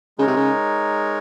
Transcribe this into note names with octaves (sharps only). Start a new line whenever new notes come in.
C#3 G#3 D#4 A#4 C#5
C3
C#3